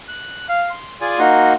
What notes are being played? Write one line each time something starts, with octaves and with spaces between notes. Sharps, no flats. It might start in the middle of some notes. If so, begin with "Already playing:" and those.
F#6
F5
C6
F4 G#4 D5 G#5
A#3 D#4 F#4 C6